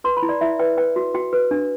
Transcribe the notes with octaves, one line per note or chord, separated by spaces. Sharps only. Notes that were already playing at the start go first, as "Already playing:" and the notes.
B4 C6
B5
E4
D5
E4 E5
B4 G5
B4 G5
F#4
F#4 G5
B4
D4